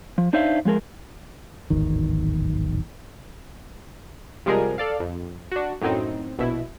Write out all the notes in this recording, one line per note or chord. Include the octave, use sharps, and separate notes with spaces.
F3
D4 D#4 C5 C#5 E5 F5
F3 G#3 G#4 A#4
D1 G#1 E2 D#3
C3 F3 G3 G#3 G#4 A#4
A4 D5 F5
F2
D4 F#4
F#2 A2 F#3 C4 D#4
A#1 B2 E4